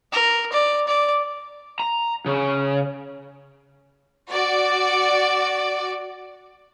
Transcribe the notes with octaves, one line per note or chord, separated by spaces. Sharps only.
A#4
D5
D5
A#5
C#3
F#4 D5